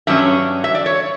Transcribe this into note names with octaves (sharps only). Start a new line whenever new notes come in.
G2 F#3 C#4 E5
E5
D5
C#5